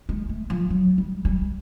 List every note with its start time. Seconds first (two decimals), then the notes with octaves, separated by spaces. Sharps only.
0.09 G#3
0.29 A3
0.50 F3
0.70 F#3
0.98 G3
1.25 G3